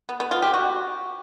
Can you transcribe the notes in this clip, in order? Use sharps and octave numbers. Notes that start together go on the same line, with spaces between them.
B3
B3
F4
G4
F#4